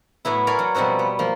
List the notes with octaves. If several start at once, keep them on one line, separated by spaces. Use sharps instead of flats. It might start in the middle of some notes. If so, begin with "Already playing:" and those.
A2 F#3 B3 E4
A#4 C#5 D5 F5 G#5 B5
F#3
B2 F3 G3 C4 F#4
B3
F3 A#3